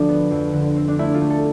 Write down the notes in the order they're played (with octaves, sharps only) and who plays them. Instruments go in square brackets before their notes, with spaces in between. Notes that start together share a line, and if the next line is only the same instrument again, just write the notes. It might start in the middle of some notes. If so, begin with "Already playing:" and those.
Already playing: [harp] D2 D3 F3 A3 D4
B3
F2
D3
C4
D4
A3 E4
F4
A3
A4